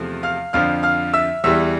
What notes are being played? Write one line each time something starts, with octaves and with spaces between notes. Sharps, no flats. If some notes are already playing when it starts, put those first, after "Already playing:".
Already playing: E2 C3 F3 A3
F5 F6
F2 D3 F3 F5 F6
F5 F6
E5 E6
E2 E3 G3 E5 E6